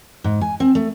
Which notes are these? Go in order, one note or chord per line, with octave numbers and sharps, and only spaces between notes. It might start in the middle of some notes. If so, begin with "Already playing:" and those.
G#2
G#5
C4
A3